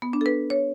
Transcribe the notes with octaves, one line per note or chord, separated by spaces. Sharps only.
B3
D4
A4
B4
C#5